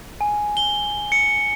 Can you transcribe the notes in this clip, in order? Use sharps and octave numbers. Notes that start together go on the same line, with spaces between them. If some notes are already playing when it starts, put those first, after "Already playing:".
G#5
G7
C#7